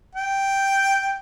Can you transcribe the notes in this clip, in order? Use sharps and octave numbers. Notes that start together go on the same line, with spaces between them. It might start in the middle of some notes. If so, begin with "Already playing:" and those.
G5